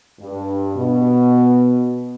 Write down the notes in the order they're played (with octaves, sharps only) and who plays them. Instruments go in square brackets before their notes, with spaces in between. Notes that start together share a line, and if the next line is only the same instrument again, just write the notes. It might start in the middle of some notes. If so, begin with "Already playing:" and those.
[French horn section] G2
B2